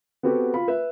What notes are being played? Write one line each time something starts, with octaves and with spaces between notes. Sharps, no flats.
B3 C4 F#4 G4 A4 B4
F4 B5
B4 E5